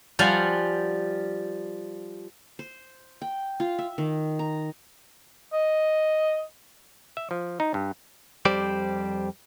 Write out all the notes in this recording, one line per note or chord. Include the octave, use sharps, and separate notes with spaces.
F3 G3 F5 F#5 G#5
C5
G5
F4
E5
D#3
A#5
D#5
E5
F3
D#4
G2
F2 G3 G4 C5 D5